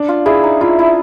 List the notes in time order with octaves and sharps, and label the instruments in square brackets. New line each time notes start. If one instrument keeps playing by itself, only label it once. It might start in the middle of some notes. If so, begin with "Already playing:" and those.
Already playing: [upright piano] D4
[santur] F4
[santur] E4 [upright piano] G#4
[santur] D#4
[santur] E4 [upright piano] F4
[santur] E4